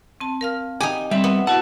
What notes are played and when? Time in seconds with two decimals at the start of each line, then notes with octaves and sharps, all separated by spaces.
0.20 C4 A5
0.41 A#4 F5 F6
0.80 D#4 G4 G#5
1.11 G3 C4 E5
1.24 B3
1.47 E4 F#4 F#5 A5